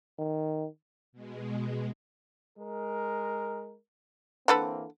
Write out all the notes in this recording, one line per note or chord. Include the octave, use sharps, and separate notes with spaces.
D#3
B2 G#3
G#3 A#4
D3 E3 A#3 C4 A4 B4